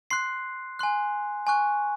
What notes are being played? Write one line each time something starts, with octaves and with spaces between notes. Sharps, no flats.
C6 F#6 C7
G#5 C6 F#6
G#5 C#6 F#6